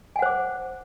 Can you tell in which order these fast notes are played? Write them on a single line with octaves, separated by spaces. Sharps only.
G#5 F#5 C5 D6